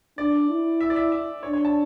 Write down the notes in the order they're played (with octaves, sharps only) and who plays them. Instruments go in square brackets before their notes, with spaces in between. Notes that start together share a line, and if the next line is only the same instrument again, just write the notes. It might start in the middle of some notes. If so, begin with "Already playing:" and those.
[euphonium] D4 [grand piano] D5
[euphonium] E4
[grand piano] E5
D5
E5
E5
[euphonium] D4 [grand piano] C#5
[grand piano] C#5
A5